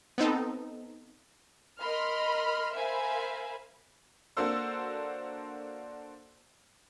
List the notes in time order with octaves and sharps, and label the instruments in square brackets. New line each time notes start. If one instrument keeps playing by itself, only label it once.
[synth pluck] B3 C4 D#4 A4
[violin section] A#4 D#5 B5 C6 F6
A#4 C5 E5 F5 G#5 B5
[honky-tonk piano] A#3 D4 F#4 A4 C5 E6